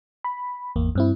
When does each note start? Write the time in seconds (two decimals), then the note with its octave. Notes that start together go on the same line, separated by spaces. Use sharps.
0.24 B5
0.76 G#1 E2 A#3
0.95 G2 C4 E4